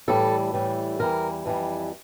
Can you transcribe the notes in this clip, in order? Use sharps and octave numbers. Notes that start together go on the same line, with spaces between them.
A2 E3 G3 A4
A2 E3 G3
E2 E3 G3 A#4
F2 E3 G3